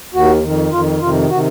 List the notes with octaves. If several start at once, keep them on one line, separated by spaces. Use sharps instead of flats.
D#2 D#3 F#4
F2 D#3
F2 D#3 F4
F2 C3 D#3 F4
C3 D#3 F#4